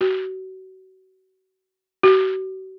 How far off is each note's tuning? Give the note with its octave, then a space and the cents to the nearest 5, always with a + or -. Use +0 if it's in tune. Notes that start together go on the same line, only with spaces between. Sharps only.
F#4 +35
F#4 +45